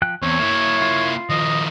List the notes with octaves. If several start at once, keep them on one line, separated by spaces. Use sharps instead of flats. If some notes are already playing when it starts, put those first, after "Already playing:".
F3 G5 F#6
E2 C4 C#5
A#3 E4 E5
F4
D#3 F3 D#5